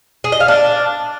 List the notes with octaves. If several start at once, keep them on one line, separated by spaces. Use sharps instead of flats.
G#4
D#5
F5
D4